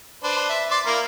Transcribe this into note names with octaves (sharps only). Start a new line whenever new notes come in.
D4 B4 C5
E5
D5 C6
A#3 E4 A#4